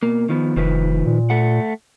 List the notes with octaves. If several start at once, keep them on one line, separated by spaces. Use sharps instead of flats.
B2 A#3
D#3 F3 B3
F1 D#3 F3 B4
A#2
A3 F#5